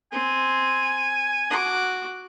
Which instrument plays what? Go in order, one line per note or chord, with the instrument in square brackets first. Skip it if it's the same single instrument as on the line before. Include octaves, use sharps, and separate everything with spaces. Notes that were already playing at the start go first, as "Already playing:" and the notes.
[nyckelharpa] C4 [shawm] G#5
[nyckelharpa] F#4 D6